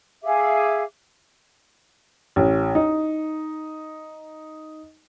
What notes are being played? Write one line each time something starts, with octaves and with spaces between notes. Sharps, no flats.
G#4 E5 F5 D6
A1
D#4